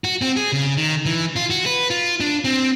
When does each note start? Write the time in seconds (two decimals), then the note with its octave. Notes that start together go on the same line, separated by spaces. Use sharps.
0.04 F#4
0.21 C4
0.36 G#4
0.52 C#3
0.78 D#3
1.06 E3
1.36 F4
1.50 F#4
1.66 B4
1.90 F4
2.20 D4
2.44 C4